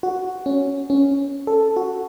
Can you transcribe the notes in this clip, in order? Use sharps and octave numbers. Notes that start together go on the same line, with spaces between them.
F#4
C#4
C#4
A4
F#4